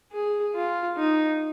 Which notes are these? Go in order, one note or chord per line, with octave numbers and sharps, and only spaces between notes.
G#4
F4
D#4